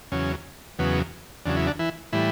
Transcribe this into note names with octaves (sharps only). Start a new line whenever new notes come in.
E2 C#3 F#3 C#4
E2 C#3 F#3 B3
E2 C#3 F#3 D4
E4
D3 D4
E3 E4
A2 E3 G3 E4